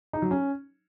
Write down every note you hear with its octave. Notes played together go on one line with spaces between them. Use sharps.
D#4
F#3
C#4